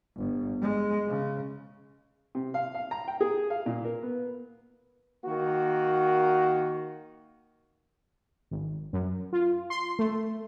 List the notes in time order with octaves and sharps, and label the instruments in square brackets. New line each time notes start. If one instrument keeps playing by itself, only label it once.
[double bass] G1
G#3
C#3
[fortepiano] C3
F5
F5
A#5
G5
G#4
F5
A#2
A#4
B3
[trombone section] D#3 A#3 F#4
[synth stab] G#1
F#2
F4
C6
A3